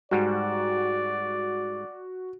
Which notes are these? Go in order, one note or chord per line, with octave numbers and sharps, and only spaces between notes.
G#2 G3 F#4 D5